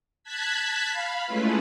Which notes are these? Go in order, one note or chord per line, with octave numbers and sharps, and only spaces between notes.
A5 F#6 G#6 B6
F5 B5
G#3 A3 C#4 E4 F4 B4